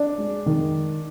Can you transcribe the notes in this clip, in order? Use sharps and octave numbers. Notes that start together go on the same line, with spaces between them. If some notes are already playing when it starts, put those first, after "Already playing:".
Already playing: D4 D5
G#3
D#3